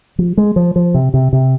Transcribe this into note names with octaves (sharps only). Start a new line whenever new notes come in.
F3
G#3
F3
F3
C3
C3
C3